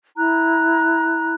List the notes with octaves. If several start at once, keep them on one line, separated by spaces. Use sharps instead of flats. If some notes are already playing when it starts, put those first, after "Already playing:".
E4 A#5 F#6